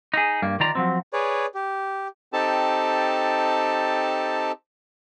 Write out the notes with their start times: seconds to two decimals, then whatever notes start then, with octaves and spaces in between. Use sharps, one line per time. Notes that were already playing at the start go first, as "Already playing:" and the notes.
0.14 D#4 G#4
0.42 G2 A#3
0.60 D#3 F4 D5 A#5
0.75 F3 F#3 C4
1.13 G#4 B4 C#5 D5
1.54 G4
2.33 C4 D#4 G4 A4 A5